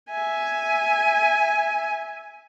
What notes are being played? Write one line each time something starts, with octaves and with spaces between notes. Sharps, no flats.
E5 G#5